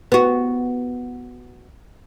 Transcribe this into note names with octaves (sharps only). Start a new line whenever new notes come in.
B3 F#4